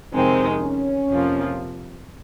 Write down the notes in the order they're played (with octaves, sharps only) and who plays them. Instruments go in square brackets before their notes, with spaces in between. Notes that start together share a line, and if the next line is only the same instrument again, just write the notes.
[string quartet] F2 C3 D#3 G#3 D#4 [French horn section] C4
[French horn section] C#4
[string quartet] F2 C3 F3 A#3 F4